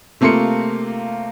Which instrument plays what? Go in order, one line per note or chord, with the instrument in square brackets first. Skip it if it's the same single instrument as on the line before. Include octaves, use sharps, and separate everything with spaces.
[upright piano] C3 A3 A#3 F4 C6 C#7